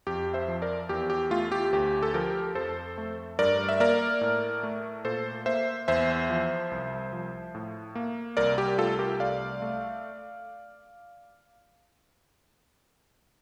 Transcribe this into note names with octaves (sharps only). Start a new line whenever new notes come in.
F2 G4
C5 E5
F3
A#4 D5
E2 G4
G4
A3 F4
G4
D2 G4
A4
F3 G4 A#4
F2 A4 C5
A3
G2 A#4 D5
E5
A#3 A#4 D5
A2
A3
A#2 A4 C5
A#3 C5 E5
E2 C5 E5
F3
C2
F3
A2
A#3
C2 A#4 D5
G4
A3 F4 A4
G4 A#4
C2 D5 F5
A3